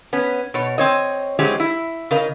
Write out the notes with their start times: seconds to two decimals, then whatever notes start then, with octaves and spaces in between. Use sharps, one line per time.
0.13 B3 C#4
0.54 B2 C#5
0.78 C4 C#5 D#5
1.39 E3 F#3 G#3 C4 C#4 G4
1.60 E4
2.11 C#3 A#4 D#5